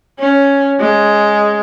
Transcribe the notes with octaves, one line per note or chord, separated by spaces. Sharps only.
C#4
G#3